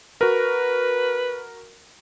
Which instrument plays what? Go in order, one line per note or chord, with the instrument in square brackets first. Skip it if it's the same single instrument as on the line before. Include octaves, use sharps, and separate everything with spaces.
[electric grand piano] F#4 A#4 [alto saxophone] B4